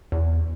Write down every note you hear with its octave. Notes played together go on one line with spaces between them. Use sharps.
E2